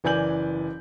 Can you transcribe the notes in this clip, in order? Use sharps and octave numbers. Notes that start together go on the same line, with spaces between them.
F#1 E3 D5 G#5 G6 F#7